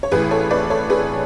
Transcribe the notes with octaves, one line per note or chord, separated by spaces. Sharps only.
C#5
A1 A2 E3 G#4 B4
A4 C#5
B4 D5
A4 C#5
G#4 B4